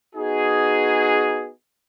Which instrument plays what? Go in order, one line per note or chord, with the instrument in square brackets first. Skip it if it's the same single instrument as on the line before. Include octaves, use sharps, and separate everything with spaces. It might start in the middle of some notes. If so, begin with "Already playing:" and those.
[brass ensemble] B3 D#4 F#4 G#4